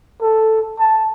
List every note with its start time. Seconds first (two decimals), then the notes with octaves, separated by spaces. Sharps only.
0.21 A4
0.79 A5